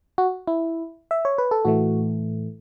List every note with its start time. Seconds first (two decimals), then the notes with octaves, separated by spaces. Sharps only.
0.18 F#4
0.47 E4
1.11 E5
1.25 C#5
1.38 B4
1.51 A4
1.65 A2 E3 A3 F#4